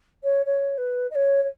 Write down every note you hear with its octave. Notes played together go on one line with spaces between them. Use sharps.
C#5
C#5
B4
D#5
C#5
C#5